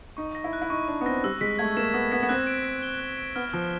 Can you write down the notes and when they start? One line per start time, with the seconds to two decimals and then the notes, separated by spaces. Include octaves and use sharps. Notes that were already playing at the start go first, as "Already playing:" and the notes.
0.17 D#4 C#6
0.35 A#6
0.44 E4
0.53 F#6
0.62 E4
0.70 D#4 C#6
0.88 D4 C#6
1.01 B3
1.06 C4 A#6
1.24 G3 E6
1.41 G#3 B6
1.59 A3 G#6
1.77 A#3 E7
1.94 B3 E6
2.12 B3 B6
2.23 B3
2.29 C4 F#6
2.47 D7
2.64 B6
2.82 G7
3.00 F#6
3.18 D7
3.35 B3 F6
3.53 F3 D7